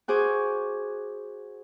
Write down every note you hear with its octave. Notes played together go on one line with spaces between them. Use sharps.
F#4 G#4 C5 D6